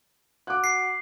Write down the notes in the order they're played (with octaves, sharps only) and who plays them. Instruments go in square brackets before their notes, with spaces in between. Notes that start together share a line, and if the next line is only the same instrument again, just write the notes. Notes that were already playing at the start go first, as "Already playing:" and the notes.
[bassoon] F#4 [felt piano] D6 F#6
[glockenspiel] C7